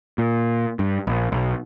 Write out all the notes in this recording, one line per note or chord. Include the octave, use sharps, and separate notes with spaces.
A#2
G2
A#1
B1